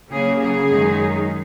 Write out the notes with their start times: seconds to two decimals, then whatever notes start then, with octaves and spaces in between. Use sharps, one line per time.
0.11 C#3 F#3 A#3 C#4 G#4
0.40 G#4
0.68 F#2 D#3 G#3 D#4